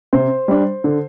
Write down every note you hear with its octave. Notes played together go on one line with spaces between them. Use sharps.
C3 C5
G3 D4
D3